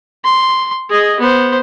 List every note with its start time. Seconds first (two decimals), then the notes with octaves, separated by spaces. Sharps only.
0.24 C6
0.90 G#4 D#5
1.20 B3 C5